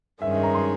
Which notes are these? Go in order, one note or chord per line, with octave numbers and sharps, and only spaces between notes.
G2 D#3 G#3 C#4 E5
E5
A#5
C6